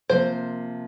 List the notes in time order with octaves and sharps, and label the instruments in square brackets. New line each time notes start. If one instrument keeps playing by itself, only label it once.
[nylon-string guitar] C3 F3 A#3 [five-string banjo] C5